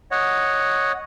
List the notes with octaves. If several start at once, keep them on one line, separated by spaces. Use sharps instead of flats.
C#5 D#5 F#5